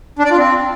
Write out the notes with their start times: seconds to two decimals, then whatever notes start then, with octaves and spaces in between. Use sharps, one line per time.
0.19 D4
0.25 D5
0.31 F4
0.37 C4